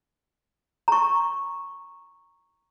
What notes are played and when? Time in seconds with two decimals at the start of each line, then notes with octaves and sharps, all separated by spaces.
0.88 A#5 C#6